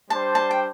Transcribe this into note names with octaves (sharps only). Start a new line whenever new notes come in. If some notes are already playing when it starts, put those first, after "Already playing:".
G3 D4 C5 A5
A5
G5